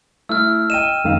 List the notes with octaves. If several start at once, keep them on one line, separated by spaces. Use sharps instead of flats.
A3 E4 E6 F6
D#5 G5 D#7 E7
F1 D#3 F5